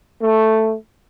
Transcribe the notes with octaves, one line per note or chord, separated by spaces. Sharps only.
A3